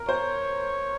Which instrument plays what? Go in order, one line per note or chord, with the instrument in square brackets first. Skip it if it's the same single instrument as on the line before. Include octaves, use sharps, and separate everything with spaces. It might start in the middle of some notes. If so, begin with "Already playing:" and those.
Already playing: [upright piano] A#4
[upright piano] C5 [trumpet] C#5